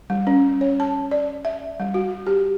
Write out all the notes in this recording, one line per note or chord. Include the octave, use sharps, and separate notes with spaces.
G3
C#4
C#5
A5
D5
E5
G3
F#4
G4